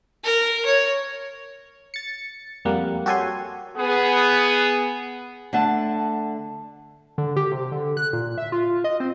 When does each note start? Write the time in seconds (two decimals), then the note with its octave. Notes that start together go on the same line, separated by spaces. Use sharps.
0.24 A#4
0.65 C#5
1.94 A6 C#7
2.65 F2 G3 A#3 F#5
3.06 F#4 G4 A4 C#5 G#5 C6
3.77 B3 G#4
5.53 D3 A3 F#5 A5
7.18 D3
7.36 G4
7.52 C3
7.72 D3
7.97 F#6
8.13 A#2
8.38 E5
8.52 F4
8.84 D#5
9.00 C4